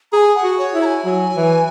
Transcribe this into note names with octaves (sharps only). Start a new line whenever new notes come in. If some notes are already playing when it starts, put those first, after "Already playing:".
G#4 G#5 A#5
F#5
F#4
C#5
E4
A#5
G#5
F#3
E3